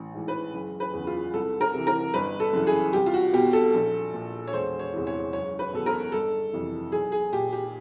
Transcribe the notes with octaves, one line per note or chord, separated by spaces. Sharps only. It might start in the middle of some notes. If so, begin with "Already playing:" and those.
Already playing: A1
G#2 E3
B4
F#1
B4
E2 C#3
F4
C2 A4
A#4
C3 E3
A#4
G1 B4
A4
F#2 C#3 E3
G#4
C2 G4
F4
F#4
B2 G4
A4
A#1
A#2
C#5
E1 C5
C#5
E2 C3 E3
C#5
F#1 C#5
B4
E2 B2 A4
A#4
G1 A4
F2 C3 E3
B1 G#4
G#4
A#2 G4
G4